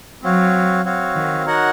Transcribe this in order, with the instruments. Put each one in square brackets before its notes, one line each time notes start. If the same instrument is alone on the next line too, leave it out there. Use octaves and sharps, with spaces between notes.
[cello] F#3 [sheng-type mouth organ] C4 F#4 C#5 F5
[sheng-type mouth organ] C4 F#4 C#5 F5
[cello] D#3
[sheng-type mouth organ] D#4 F#4 A#4 C#5 F#5